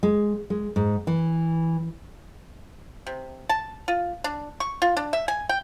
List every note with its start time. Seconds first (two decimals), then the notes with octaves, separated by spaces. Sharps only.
0.03 G#3
0.50 G#3
0.76 G#2
1.07 E3
3.07 C3
3.49 A5
3.88 F4
4.24 D4
4.60 C#6
4.82 F4
4.97 D4
5.13 E5
5.28 G#5
5.49 G5